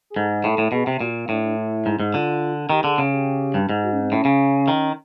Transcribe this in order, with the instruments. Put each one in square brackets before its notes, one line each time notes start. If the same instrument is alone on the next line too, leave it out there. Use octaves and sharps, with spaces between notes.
[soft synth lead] G#4
[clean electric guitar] G#2 [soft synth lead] A4
[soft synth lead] G#4
[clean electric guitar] A2 [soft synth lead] A4
[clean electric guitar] A2
[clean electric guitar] B2 [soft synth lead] G#4
[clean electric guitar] C3
[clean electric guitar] A#2 [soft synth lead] F#4
[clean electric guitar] A2 [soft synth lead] D4
[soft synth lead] D4
E4
[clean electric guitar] G#2
G#2
[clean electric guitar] D3 [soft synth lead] F4
[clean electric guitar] D#3 [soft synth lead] G4
[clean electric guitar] D3 [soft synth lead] G#4
[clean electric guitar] C#3 [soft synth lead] G#4
[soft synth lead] G4
[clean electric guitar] G2
G#2
[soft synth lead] F#4
C#4
C4
[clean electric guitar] A2 [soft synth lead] C#4
[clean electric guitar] C#3
D#3